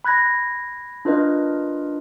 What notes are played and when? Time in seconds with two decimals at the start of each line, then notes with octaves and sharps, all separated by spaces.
0.04 B5 F#6 G#6 A#6
1.05 D4 F4 A#4 B4 D#5